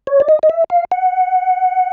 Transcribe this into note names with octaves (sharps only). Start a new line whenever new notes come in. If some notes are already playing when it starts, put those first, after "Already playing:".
C#5
D5
D#5
D#5
E5
F5
F#5